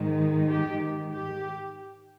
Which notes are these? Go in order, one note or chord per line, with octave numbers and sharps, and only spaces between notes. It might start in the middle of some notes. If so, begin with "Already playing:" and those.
Already playing: G#2 D#3
G4
G4